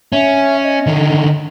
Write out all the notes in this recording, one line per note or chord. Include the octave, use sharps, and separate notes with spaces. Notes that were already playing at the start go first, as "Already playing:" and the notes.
C#4 E5
D#5
D3 D#3